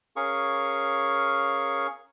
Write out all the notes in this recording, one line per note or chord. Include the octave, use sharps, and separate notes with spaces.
C#4 G#4 A#4 F5 C#6